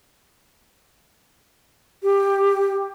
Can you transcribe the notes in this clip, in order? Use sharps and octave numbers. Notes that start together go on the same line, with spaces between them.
G4